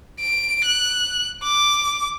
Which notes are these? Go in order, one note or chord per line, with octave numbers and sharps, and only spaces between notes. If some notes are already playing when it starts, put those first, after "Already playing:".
D7
F#6
D6